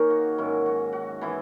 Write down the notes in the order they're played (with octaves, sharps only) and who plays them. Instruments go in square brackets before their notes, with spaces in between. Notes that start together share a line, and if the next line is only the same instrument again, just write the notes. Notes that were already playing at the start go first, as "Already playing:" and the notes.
Already playing: [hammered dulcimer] D#3 A#3 D#4 G#4 A#4 C#5
F#4
G#2 D#3 F#3 C#4 E4
F#4
F#4
E3 B3 E4